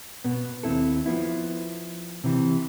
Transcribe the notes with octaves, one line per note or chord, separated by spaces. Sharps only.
B2 B3
D#2 C4 E4 A4
F3 B3 E4
C3 E3